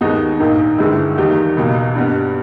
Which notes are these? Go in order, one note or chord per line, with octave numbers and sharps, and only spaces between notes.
D#2 D#3 G#3 B3 D#4
A#1 G#2 D#3 A#3
G1 G2 D#3 G#3 E4
E2 D#3 G3 A#3 D#4 G4
C#2 B2 A#3
G2 G3 B3